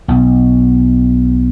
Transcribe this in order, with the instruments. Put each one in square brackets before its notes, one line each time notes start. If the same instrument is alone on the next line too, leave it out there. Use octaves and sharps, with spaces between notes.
[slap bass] B1